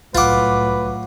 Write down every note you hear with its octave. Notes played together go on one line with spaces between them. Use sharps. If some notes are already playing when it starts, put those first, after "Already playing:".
C2 A2 F#3 F4 B4 F#5 D6